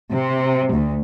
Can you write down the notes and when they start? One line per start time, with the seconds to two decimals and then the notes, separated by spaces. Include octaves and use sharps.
0.12 C3
0.72 D2